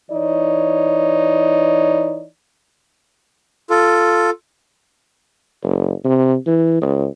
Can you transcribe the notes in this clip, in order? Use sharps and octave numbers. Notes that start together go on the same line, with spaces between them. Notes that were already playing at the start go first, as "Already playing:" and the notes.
E3 D#4 C#5 D5
F4 A4
F#1
C3
E3
C#2